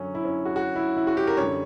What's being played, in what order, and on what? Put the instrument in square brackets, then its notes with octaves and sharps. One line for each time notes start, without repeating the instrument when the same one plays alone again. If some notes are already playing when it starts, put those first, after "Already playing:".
Already playing: [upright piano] F#2 D3 F#3 C#4
E4
C#4
F#4
F#4
E4
E4
F#4
G4
A#4
F#2 D3 G3 C#5